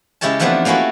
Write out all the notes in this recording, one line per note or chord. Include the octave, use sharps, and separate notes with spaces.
C#3 G#3 E4 G4 C#5 A5
E3 F3 A3 B3 C4 D4
A3 A#3 C#4 E4 F#4